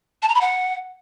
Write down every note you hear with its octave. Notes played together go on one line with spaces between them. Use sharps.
A5
A#5
B5
F#5